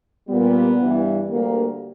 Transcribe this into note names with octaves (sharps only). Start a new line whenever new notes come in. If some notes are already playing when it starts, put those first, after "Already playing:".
A#2 G3 B3
G2 E3 G3
D2 D3 G3 A#3